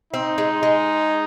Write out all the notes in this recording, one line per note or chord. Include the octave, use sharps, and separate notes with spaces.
C4 D#4
G#3
G#3